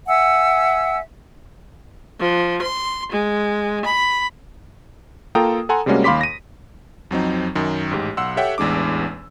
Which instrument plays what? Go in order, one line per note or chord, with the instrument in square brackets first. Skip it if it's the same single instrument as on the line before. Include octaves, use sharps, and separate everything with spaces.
[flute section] E5 F#5 G#5 E6
[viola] F3
C6
G#3
B5
[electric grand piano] A#3 F4 A4 G5 A#5 D#6
A4 F#5 G#5 A#5 C6
C3 G3 G#3 A#3 C#4 F#4
D#2 F5 B5 C6 D6 B6
A#6 D#7
F2 F#3 C4 D#4
F#2 D#3
A1 G#2 G4
B1 F#5 C6 E6
G4 A4 C#5 E5 F#5 G5
A1 E2 G#3 D4 D6